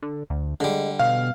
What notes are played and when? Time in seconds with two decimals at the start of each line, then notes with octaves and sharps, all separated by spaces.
0.02 D3
0.30 D2
0.60 D3 G3 G#3
0.99 B2 F5